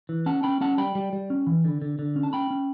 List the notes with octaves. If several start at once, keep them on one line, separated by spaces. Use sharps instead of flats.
E3
C#4 F#5 A5
C#4 G5 B5
C#4 F#5 A5
G3 G5 B5
G3
G3
C#4
E3
D3
D3
D3
C#4
A5
C#4 G5 B5
C#4